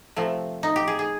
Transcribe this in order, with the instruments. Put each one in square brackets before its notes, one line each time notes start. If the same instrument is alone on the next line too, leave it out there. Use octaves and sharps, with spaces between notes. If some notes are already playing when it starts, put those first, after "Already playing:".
[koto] C3 F3 A3
D#4
G4
G#4
G#4